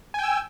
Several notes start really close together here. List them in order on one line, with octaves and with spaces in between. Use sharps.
G#5 G5 E6